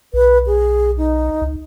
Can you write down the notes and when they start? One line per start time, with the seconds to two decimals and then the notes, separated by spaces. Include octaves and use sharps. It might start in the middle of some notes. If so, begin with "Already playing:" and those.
0.14 B1 B4
0.47 G#4
0.98 D#4
1.41 C#2